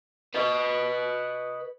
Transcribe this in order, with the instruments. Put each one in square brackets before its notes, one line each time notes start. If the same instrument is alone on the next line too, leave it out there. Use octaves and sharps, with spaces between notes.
[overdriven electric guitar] B4 D#5